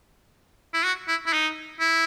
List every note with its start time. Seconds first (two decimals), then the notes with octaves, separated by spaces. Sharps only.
0.74 E4
0.85 F#4
1.08 E4
1.26 E4
1.33 D#4
1.80 E4